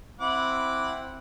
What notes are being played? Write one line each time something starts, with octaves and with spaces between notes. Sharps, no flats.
C4 E4 F#5 B5 D6